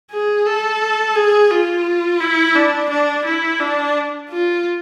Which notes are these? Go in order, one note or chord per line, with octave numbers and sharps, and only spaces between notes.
G#4
A4
G#4
F4
E4
D4
D4
E4
D4
F4